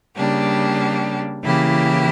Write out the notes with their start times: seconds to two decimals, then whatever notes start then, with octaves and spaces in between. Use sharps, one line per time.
0.16 C#3 G3 A#3 D4 G4
1.43 C#3 E3 A#3 E4 G4